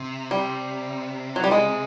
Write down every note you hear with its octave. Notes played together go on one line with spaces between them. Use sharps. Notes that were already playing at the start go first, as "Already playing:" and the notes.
Already playing: C3
G3
F#3
G3
G#3